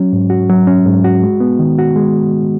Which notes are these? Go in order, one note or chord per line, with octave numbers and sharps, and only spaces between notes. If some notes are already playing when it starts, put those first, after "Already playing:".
Already playing: F#3 C#4
G#2
F#4
F#3
C#4
G#2
F#4
G#3
B3
D#3
F#4
G#3